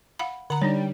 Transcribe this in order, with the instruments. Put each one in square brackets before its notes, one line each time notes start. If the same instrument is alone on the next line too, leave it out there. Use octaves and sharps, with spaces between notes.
[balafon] F5 F#5 B5
[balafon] D3 A#5 [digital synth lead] F#5
[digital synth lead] G3 [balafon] D4 D#4 C#5